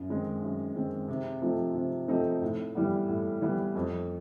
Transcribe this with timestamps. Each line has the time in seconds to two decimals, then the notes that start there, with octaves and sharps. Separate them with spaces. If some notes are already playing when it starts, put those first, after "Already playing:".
Already playing: F#2
0.09 D#3 G#3 C4
0.43 F#2
0.75 D#3 G#3 C4
1.08 C3
1.41 F3 A3 C4 D#4
1.75 C3
2.08 F3 A3 C4 D#4
2.42 A2
2.75 E3 G3 B3
3.08 A2
3.42 E3 G3 B3
3.75 F2